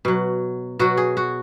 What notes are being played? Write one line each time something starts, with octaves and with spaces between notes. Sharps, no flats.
B2 F#3
B2 F#3 F#4
G#4
F#4